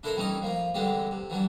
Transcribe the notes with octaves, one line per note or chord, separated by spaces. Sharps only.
D4 E4 A4 A#4 C5 E5
E3 G3 C4 C#4 D#4 D#5
F3 A#3 F4
D3 E3 G3 G#3 C4 G4
C3
E3 F#3 G3 D4